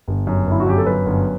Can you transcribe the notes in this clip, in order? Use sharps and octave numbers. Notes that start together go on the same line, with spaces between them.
G1
F#2
G1 E4
F#4
F#2 G4
A4
F#2 B4
G1